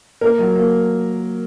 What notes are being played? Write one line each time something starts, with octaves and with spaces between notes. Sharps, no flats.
A#3 A#4
F#3
A#3